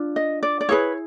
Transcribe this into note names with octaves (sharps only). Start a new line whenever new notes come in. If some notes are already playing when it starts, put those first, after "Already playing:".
Already playing: D4 F4
D#5
D5
D5
E4 G#4 B4 C#5